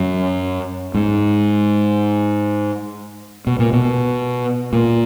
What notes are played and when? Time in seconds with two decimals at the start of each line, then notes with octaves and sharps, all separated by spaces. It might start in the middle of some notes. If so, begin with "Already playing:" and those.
Already playing: F#2
0.95 G#2
3.47 B2
3.59 A#2
3.73 B2
4.73 A#2